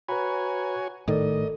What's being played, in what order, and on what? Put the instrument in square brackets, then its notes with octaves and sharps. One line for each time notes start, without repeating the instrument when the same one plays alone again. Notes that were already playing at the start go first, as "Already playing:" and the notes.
[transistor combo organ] F#4 C#5 G#5 [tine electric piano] B4 A#5 B5
[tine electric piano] G#1 A#4 D5 [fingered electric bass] A2 D#3 [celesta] A4 [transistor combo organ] D#5